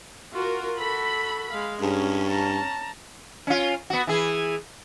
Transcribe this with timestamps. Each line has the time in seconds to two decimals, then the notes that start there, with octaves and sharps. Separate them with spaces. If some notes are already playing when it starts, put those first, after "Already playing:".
0.33 F4 F#4 A#4
0.79 F#4 A4 B5
1.51 G#3 F5
1.81 G2 C#4 G#4
2.28 A5 A#5
3.47 C#4 F4
3.90 B3 F#4
4.07 E3 G#4